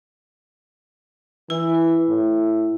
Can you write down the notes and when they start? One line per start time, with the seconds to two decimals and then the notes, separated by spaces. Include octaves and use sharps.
1.50 E3 E4
2.09 A2